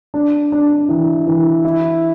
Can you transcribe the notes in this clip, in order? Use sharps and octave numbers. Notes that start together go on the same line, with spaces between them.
D4
D4
E3
E3
E4